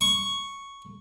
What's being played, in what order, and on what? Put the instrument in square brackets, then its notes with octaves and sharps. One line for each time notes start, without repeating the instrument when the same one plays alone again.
[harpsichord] C#6